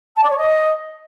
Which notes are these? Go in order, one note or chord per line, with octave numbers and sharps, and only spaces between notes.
A5
D5
C#5
D#5